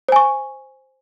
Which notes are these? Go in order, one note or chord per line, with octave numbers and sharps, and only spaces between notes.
C5 G#5 C#6